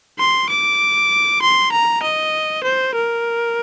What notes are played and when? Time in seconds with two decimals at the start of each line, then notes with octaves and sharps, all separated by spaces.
0.19 C6
0.50 D6
1.42 C6
1.72 A#5
2.03 D#5
2.63 C5
2.95 A#4